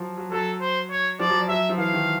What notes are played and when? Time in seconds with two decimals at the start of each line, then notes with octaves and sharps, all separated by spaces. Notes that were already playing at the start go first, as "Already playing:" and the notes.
Already playing: F3 F#3
0.17 F#3
0.32 F#3 A4
0.61 C5
0.90 C#5
1.19 F3 D5
1.30 F#3
1.49 F#3 E5
1.69 F3
1.78 E3 F5
1.93 D#3